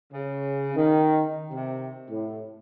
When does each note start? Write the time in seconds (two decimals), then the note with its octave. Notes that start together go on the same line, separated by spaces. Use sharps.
0.13 C#3
0.75 D#3
1.52 C3
2.11 A2